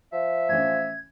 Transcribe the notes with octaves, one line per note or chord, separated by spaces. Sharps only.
F3 E5
A2 E3 C#4 G#6